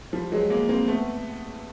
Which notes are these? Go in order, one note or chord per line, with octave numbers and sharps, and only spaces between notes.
F3 G3
F#3 G#3
G#3 A#3
A#3 C4
A3 B3